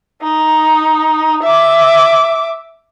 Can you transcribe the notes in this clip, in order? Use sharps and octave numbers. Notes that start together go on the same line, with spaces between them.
D#4
E5 D6